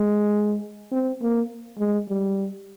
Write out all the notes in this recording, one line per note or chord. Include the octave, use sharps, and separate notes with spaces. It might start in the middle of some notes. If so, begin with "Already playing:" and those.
Already playing: G#3
C4
A#3
G#3
G3